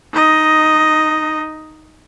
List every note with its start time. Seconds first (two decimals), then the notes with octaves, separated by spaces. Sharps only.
0.13 D#4 D#5